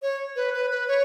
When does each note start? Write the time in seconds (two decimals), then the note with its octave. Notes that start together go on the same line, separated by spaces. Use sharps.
0.02 C#5
0.36 B4
0.54 B4
0.70 B4
0.88 C#5